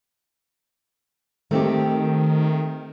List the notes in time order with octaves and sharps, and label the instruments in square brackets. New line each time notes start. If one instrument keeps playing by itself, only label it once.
[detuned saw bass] D#3 [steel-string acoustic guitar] A3 C4 G4